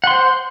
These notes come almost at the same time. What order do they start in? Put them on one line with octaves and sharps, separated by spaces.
F#5 C6 C5